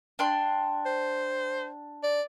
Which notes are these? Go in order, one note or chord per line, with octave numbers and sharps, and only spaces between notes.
D4 G5 C6
C5
D5